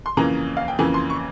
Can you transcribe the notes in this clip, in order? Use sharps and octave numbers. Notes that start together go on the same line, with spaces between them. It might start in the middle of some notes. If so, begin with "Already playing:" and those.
C6
F2 C#3 E3 A#3 C#4 A#5
F5
G5
F2 C#3 E3 A#3 C#4 G#5
C6
C#6